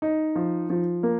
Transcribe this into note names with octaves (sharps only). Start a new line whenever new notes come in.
D#4
F3
F3
A#3